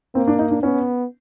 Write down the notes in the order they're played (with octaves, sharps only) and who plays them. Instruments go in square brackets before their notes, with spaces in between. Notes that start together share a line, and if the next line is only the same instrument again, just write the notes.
[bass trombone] A#3 [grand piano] C4
[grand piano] D4
D#4
D4
[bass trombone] B3 [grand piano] C#4